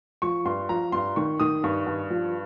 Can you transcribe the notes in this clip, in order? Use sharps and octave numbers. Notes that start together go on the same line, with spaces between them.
F3 C#6
G2 C6
F3 A#5
G2 C6
D#3 C#6
D#3 D#6
G2 C#6
G2
F3